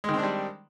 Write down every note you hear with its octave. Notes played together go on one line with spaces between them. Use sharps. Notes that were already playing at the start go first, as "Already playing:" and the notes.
D#3 G3 G#3 C4 D4